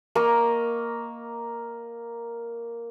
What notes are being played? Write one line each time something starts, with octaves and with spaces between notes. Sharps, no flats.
A#3 D#5 A#5 C#6